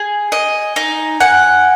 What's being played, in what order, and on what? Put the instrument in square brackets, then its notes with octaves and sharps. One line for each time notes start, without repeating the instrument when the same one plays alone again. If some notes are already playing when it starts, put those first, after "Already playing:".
Already playing: [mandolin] G#4 [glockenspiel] G#5 G#6
[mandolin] D#5
D#4
[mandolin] F#5 [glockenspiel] G#5 G#6